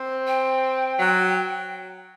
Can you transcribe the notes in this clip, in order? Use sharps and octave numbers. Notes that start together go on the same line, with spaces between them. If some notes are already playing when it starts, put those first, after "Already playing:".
Already playing: C4
G5
F#3